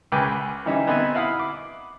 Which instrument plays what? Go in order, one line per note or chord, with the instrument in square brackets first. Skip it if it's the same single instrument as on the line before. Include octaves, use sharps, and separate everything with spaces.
[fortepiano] C#2 C#3 B4 G5 G#5 D6
E3 G3 C#4 D#4 E5
B3 C4 D#4 B4 E5 G#5
E4 F5 F#5 B5 D#6
D6